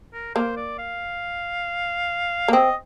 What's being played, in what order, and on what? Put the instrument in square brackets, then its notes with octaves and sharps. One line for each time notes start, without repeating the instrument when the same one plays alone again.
[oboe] A#4
[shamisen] A#3 [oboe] C5
[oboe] D5
F5
[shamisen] A#3
[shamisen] C4 [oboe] D#5